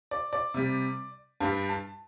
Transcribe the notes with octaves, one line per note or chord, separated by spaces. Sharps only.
D5
D5
C3 G3
G2 G3 A5
A5